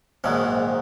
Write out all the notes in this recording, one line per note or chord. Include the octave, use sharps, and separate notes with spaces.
A#1 G#2 D#3 F#3